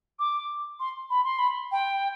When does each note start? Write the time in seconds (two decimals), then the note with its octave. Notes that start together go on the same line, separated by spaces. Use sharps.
0.19 D6
0.80 C6
1.10 B5
1.24 C6
1.39 B5
1.71 G5